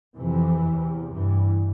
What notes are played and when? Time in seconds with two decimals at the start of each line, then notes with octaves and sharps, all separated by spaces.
0.15 F2 C3 E3
0.64 E2 C3
1.12 G2 E3